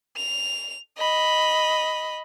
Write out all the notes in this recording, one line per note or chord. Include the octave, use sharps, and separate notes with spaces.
F7
D#5 B5